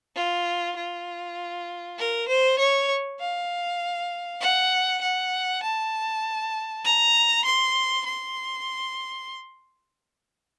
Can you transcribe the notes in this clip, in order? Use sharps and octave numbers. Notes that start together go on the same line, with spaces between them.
F4
F4
A#4
C5
C#5
F5
F#5
F#5
A5
A#5
C6
C6